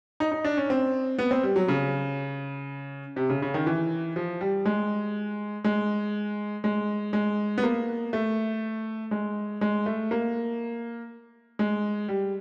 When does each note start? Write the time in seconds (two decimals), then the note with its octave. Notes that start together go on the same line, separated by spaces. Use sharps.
0.20 D#4
0.32 D#4
0.45 D4
0.57 C#4
0.70 C4
1.18 B3
1.31 C4
1.43 G3
1.56 F#3
1.68 C#3
3.16 C3
3.30 C#3
3.42 C#3
3.54 D#3
3.66 E3
4.16 F3
4.41 G3
4.65 G#3
5.64 G#3
6.64 G#3
7.13 G#3
7.58 B3
7.63 A#3
8.13 A3
9.11 G#3
9.61 G#3
9.86 A3
10.11 A#3
11.59 G#3
12.08 G3